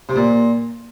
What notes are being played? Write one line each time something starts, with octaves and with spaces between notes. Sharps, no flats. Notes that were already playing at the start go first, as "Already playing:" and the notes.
C3
A#2